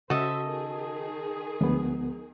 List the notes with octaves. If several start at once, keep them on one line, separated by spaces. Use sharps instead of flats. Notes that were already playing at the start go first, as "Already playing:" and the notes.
C#3 F#4 A4 C5 D#5 E5
D#3 G#4
D2 F3 G#3 B3 D4